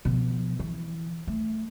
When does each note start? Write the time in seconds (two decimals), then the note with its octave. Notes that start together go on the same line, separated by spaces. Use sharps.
0.05 B2 F3
0.59 E3
1.27 A3